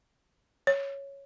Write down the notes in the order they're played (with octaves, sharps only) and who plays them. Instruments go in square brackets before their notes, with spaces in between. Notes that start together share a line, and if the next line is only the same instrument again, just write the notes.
[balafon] C#5